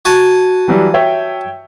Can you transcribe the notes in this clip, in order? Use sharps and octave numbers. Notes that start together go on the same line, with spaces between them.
F#4 G#5 A5
E3 F#3 G3
C#5 E5 G5